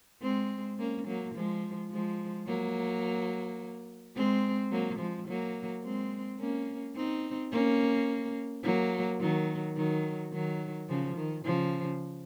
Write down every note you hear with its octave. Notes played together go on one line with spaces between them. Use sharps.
G#3 C4
A#3 C#4
F#3 A#3
F3 G#3
F3 G#3
F#3 A#3
G#3 C4
F#3 A#3
F3 G#3
F#3 A#3
G#3 C4
A#3 C#4
C4 D#4
A#3 C#4
F#3 A#3
D#3 F#3
D#3 F#3
D#3 F#3
C#3 F3
D#3
C#3 F3